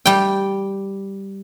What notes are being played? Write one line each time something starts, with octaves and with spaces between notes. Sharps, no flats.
G3 G5